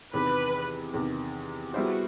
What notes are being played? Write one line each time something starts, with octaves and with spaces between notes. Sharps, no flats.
E2 C3 D#3 B4
E2 C3 D#3
G3 B3 E4 F#4 G#4 C5